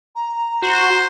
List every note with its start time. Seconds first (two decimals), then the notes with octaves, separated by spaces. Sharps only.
0.15 A#5
0.62 F#4 C5